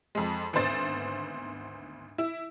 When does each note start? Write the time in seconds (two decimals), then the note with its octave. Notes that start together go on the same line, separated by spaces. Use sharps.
0.15 F2 G#3
0.53 G#1 D2 B3 C5 A6
2.18 E4